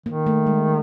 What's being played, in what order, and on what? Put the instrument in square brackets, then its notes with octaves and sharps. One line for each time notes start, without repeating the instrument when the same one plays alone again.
[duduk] D#3 [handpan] A#3
[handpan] A3
G#3